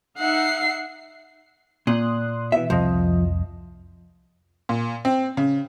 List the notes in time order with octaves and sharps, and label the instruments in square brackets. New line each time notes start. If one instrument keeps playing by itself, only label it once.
[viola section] D#4 E5 F#5 [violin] C7
[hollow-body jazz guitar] A#2 [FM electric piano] C6 D#6 F#6
[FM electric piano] B2 E3 [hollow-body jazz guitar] E5
[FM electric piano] C2 F2 D#5 [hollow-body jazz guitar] F3
[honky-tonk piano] A#2
C4
C#3